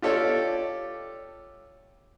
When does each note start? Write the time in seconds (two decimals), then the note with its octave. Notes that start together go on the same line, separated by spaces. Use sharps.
0.02 F4 G4 A4 C#5 D5